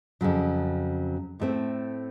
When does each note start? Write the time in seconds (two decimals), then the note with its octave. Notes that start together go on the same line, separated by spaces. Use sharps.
0.21 F2 C#3 F#3
1.40 A2 A3 C4